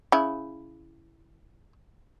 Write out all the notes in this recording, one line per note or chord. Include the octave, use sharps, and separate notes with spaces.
C#3 E4